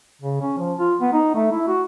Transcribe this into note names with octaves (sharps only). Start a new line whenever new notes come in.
C#3
C#4
F3
F4
B3
D#4
A3
E4
F#4